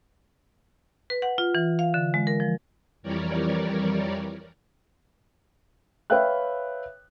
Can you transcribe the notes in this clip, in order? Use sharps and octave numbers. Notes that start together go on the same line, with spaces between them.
B4
F#5
F4
E3
F5
D3
G#3
A#4
F3
F2 E3 G3 A#4 C#5 D5
B4 C#5 E5 F5 G5 F#6